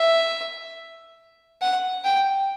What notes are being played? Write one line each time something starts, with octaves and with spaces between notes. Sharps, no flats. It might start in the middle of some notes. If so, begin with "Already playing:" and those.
Already playing: E5
F#5
G5